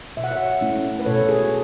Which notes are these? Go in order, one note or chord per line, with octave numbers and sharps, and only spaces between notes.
B2 E5
F#5
C#5 E5
A3 C#4 E4
B4
B2 A4 C#5
G#4